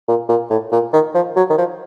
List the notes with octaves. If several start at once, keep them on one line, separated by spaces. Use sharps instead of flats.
A#2
A#2
A2
A#2
D#3
F3
F#3
D#3
F3